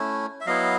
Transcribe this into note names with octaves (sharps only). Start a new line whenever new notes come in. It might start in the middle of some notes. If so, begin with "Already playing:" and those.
Already playing: A3 C#4 E4
E5
F#3 B3 E4 D#5 F5